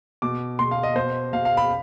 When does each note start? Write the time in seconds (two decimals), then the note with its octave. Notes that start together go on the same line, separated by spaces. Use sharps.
0.22 B2 D6
0.59 B2 C6
0.71 F5
0.83 D#5
0.95 B2 C5
1.33 B2 F5
1.45 F5
1.57 B5